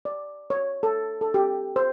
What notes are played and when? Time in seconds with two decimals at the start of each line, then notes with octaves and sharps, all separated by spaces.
0.05 D5
0.50 C#5
0.83 A4
1.21 A4
1.34 G4
1.76 C5